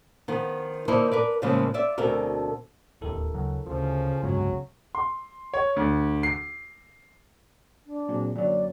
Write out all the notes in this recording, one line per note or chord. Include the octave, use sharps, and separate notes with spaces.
D#3 F3 B3
D3 A#3 D#4 E4 A#4 C5
A#4 B4 D5
A2 C#3 E3 F3 G#3 A#3
F4 D5 E5
D2 B2 C4 A4 A#4
D1 D#2 E4 A4 A#4
D2 C#3 F#3
D2 C#3 F3
F1 C2 G2 F#3 G#3 B3
C6
C#5
D2
C7
D4
A#2 F#3 C4 G#4
F#2 D3 F#3 A#3 D5